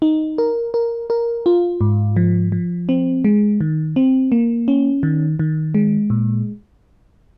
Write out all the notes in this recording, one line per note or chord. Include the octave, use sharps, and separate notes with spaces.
D#4
A#4
A#4
A#4
F4
G#2
F3
F3
C4
G#3
D#3
C4
A#3
C#4
D#3
D#3
G#3
A#2